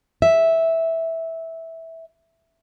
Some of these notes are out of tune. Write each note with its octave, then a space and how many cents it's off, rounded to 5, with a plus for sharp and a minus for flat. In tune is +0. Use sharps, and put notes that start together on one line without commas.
E5 -10